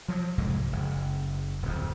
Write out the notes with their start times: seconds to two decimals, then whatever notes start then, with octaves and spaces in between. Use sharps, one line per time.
0.08 F3 F#3
0.38 F1 C2 G#2 G#3
0.72 F#1
1.62 D1 F2